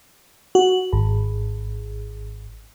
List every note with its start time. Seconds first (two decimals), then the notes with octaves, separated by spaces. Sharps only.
0.55 F#4
0.93 G#1